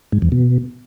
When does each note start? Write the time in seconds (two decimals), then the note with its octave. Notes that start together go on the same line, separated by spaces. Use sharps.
0.12 G#2
0.22 E2
0.32 B2